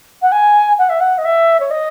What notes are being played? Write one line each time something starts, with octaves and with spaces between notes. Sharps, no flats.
F#5
G#5
F#5
E5
F#5
D#5
E5
C#5
D#5